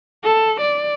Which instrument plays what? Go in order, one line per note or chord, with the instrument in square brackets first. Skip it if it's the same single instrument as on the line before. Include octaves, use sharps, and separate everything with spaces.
[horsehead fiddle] A4
D5